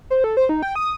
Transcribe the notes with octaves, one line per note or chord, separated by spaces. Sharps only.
C5
A4
C5
D#4
G5
D#6